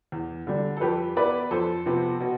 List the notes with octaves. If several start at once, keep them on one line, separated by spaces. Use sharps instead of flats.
E2
D3 G3
A4
F2 G4 B4
E3 B3 E4 B4 D5
F2 A4 C5
C3 F3 B3
B2